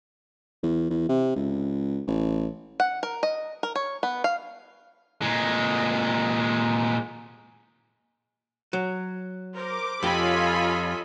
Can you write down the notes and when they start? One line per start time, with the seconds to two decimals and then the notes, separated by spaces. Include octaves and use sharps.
0.63 E2
0.90 E2
1.09 C3
1.36 C#2
2.07 A1
2.80 F#5
3.03 A#4
3.23 D#5
3.63 A#4
3.76 C#5
4.03 B3
4.24 F5
5.22 A#2 G#3
8.73 F#3
9.55 A#4 C5 D6
10.03 F2 F4 G4 A4 C#5 D#5 G#5 B5